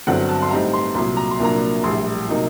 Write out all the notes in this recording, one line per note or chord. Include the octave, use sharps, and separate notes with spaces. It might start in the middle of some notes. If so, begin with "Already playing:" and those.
G1 G2 D3 F#3 C4 F#5
A5
C6
A2 G3 C4 D#4 A#5
C6
C2 A#2 F#3 C6
A#5
C6
C2 A#2 F#3 A#3 D4 A#5
A#1 A2 G3 C6
C3 F#3 A#3 D#4